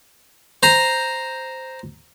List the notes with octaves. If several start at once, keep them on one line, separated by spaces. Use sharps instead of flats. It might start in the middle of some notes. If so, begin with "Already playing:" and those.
C5 A#5